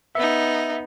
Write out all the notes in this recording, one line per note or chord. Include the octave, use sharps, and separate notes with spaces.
B3 D#4 E5